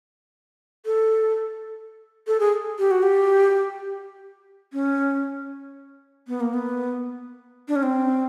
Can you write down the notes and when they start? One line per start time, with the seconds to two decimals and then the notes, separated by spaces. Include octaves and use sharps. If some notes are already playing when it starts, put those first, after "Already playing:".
0.86 A4
2.27 A4
2.40 G#4
2.79 G4
2.91 F#4
3.03 G4
4.73 C#4
6.28 B3
6.41 A#3
6.54 B3
7.68 D4
7.76 C#4
7.83 C4